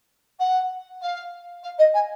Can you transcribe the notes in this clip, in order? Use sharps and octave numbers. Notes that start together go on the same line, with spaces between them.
F#5
F5
F5
D#5
G#5